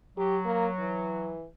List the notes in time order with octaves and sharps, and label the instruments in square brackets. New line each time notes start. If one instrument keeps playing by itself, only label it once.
[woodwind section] F#3 [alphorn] G4
[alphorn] A#3
E3